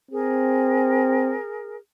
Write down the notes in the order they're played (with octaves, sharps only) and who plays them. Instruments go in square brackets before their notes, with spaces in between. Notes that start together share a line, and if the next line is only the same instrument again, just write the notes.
[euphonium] C4 [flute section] G#4 A#4